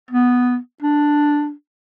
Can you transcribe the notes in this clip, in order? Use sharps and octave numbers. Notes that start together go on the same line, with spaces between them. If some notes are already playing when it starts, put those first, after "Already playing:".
B3
D4